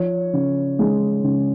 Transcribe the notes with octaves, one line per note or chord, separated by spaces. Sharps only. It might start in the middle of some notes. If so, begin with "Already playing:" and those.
Already playing: F3 C#5
C#3
G#3
C#3